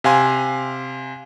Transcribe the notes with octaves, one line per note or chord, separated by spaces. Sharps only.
C3 F5 G#5 C6